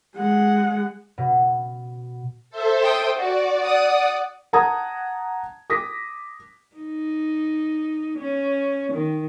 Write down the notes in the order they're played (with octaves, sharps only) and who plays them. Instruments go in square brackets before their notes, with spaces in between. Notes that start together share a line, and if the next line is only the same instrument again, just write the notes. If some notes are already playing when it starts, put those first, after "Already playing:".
[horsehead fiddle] G#3 F#5
[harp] B2
[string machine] A4 C5 E5
[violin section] G5 C6 D#6
[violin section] F#4 [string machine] D5
[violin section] F#5 D#6
[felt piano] F#5 A5 A#5 D#6 G#6
D6 D#6 A#6 B6
[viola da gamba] D#4
C#4
D#3